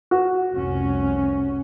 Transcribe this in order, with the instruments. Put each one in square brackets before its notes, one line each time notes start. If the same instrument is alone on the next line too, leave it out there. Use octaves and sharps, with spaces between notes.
[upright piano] F#4
[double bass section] F1 C2 C#4